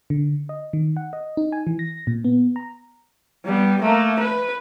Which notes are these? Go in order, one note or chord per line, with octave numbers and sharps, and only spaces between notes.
D3
D#5
D#3
F#5
D#5
D#4
G#5
E3
A#6
A#2
B3
A#5
G3 B3
A3 A#3
B4